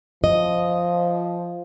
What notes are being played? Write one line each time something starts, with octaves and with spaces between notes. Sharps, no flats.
F3 D#5